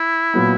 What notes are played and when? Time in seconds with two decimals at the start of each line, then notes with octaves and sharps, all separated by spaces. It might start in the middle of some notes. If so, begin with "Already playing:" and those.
Already playing: E4
0.34 A#2 F#3 B3